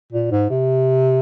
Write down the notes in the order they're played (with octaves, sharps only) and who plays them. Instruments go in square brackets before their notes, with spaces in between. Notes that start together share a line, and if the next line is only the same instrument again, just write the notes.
[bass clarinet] A#2
G#2
C3